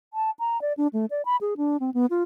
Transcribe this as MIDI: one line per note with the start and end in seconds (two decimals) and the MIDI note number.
0.14 0.30 81
0.39 0.60 82
0.62 0.73 74
0.77 0.87 62
0.93 1.06 57
1.11 1.22 74
1.25 1.36 83
1.41 1.54 68
1.57 1.77 62
1.80 1.90 60
1.94 2.06 59
2.10 2.23 65